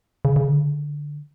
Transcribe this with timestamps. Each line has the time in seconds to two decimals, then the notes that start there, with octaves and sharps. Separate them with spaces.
0.25 C#3
0.36 C#3
0.47 D3